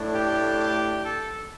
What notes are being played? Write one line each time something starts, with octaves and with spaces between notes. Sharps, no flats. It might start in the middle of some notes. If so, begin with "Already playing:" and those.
Already playing: A2 A3 D4
G4
G4
A4